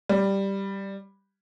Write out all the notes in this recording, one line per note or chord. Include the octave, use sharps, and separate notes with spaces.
G3